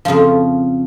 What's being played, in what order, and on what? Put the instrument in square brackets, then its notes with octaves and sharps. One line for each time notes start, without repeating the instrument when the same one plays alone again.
[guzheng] F2 C#3 F3 F4